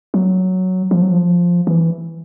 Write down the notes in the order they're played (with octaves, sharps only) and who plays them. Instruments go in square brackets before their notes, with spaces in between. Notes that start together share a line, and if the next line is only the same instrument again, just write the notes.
[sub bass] F#3
F3
F#3
F3
E3